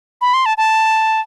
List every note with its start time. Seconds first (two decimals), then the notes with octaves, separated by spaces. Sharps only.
0.21 B5
0.34 C6
0.46 A5
0.58 A5